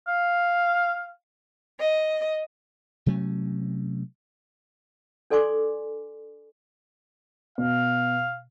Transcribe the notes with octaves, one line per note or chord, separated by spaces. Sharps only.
F5
D#5
C3 F#3 A3 C#4
D4 A4 D5 G#5 C6 D6
B2 F5